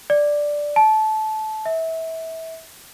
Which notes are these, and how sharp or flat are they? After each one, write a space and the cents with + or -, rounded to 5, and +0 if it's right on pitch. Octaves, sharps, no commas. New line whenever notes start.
D5 +0
A5 -20
E5 -25